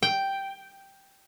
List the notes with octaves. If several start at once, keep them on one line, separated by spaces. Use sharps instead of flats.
G5